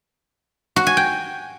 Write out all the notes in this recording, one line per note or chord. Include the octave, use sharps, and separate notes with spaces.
F#4
G#5
G5